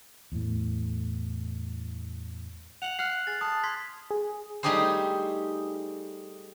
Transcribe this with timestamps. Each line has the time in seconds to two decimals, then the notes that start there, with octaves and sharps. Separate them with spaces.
0.32 E2 A2
2.82 F#5 F7 F#7
2.99 F#5 F6 F#6 C7
3.27 G#4 A6
3.41 A5 D#6
3.63 C6 G#6 B6
4.11 G#4
4.63 G3 A3 D#4 G4 G#4 C5